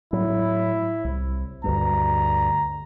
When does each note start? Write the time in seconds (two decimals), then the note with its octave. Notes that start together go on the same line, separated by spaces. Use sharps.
0.13 A2 F#3 E4
1.04 C2
1.64 D2 G2 A#5